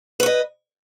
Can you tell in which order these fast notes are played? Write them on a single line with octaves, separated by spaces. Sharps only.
B4 C#5 D#5